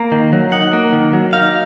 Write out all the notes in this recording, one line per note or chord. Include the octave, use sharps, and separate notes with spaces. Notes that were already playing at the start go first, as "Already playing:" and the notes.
Already playing: A#3 A#5
D#3
F#3
D#4 F#5
A#3
D#3
F#3
D#4 F5